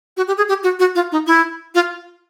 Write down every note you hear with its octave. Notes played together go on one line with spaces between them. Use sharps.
F#4
G4
G#4
G4
F#4
F#4
F4
D#4
E4
F4